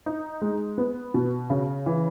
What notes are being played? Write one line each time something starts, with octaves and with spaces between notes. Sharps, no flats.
D#4
G#3
B3
B2
C#3
E3